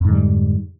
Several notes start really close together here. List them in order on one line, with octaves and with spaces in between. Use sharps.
F2 G#2 D3 G3